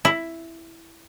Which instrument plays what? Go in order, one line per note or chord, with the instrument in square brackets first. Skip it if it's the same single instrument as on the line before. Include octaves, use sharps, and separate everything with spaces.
[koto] E4